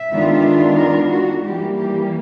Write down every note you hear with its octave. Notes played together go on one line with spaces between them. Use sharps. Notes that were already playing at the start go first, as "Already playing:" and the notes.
Already playing: E5
D#3 G#3 B3 D4 F4
A#4
F#4
E3 G3 A#3 G4
G4